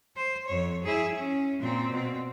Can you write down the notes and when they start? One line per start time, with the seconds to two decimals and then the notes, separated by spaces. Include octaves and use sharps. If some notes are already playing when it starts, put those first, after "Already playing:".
0.16 C5
0.47 F2 C#5
0.83 E4 G#4
1.15 C#4
1.60 A#2 C4
1.91 B2 C4